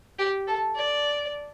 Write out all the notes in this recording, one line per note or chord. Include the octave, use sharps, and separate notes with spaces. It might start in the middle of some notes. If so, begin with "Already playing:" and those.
G4
A4
D5